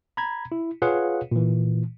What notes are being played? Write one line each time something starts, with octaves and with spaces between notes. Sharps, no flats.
A#5 B5 G#6
E4
F4 G#4 B4 C#5 F5 F#5
A#2 E3